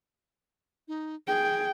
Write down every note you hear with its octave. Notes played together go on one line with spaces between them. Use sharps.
D#4
G#4 G5